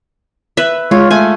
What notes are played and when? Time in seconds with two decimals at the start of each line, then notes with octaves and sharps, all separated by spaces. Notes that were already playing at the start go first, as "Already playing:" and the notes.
0.57 B4 E5
0.91 G#3 F4 C#5
1.11 A3 G#5